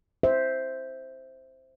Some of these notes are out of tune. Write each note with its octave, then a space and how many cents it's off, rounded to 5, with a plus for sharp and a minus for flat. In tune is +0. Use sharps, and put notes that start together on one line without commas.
C5 +0 E5 -10